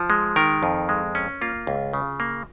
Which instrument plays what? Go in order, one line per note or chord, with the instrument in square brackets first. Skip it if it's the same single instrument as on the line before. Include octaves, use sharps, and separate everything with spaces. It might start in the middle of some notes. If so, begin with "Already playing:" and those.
Already playing: [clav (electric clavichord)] F3
G#3
D#3 A#4
F2
G#3
C#4
A#3 F4
C#2
C#3
A#3